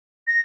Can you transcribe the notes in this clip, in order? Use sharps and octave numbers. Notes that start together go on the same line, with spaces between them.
A#6